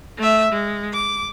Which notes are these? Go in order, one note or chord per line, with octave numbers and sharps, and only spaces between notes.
A3 E5
G#3
D6